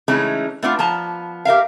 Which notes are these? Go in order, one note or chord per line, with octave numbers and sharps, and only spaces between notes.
C#3 E3 G#3 A3 C#4 D#4
A3 B3 D4 F4
F3 B3 A5 A#5
G4 A#4 E5 F5